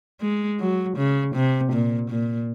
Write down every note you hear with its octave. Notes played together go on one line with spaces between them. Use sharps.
G#3
F#3
C#3
C3
A#2
A#2